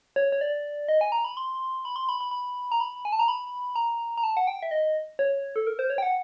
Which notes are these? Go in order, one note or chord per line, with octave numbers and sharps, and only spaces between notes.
C#5
C#5
D5
D#5
G#5
A#5
B5
C6
B5
C6
B5
B5
B5
A#5
B5
G#5
A5
A#5
B5
A#5
A#5
A5
F#5
G5
E5
D#5
C#5
A4
A#4
C5
C#5
G5
F#5